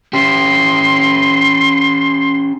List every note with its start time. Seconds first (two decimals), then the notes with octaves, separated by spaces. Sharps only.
0.13 C#4 G4 C6